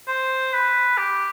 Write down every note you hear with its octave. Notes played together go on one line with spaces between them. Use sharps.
C5
B4
G4